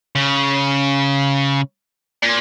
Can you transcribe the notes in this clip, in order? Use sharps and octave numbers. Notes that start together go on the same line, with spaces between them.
C#3
A#2